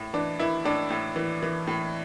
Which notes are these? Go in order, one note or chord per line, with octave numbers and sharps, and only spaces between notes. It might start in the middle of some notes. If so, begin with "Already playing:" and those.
Already playing: A2
E3 D4
E3 E4
A2 D4
A2
E3
E3
A2